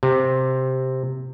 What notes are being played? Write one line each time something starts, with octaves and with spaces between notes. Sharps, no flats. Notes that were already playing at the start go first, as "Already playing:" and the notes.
C3